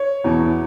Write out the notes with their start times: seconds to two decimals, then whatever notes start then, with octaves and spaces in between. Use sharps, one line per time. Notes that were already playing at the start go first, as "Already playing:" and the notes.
Already playing: C#5
0.24 E2 B2